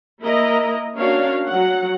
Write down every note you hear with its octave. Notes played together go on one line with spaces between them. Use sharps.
A#3 E4 A#4 D#5 A#5
A#3 C#4 D4 F#4 C#5 F5
F#3 F#5